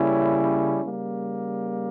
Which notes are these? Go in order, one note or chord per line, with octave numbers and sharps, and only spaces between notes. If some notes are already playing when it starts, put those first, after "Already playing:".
Already playing: C#3 G3 A#3 C#4 E4
C#3 G3 A#3